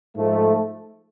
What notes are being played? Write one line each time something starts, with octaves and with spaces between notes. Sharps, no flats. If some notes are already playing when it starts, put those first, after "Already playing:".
G#2 F3 A3